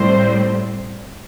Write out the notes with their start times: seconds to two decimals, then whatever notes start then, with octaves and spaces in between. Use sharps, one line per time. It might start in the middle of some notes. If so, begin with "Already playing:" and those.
Already playing: A2 G3 C4 C5